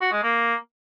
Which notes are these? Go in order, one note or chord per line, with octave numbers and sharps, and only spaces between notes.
F#4
G#3
A#3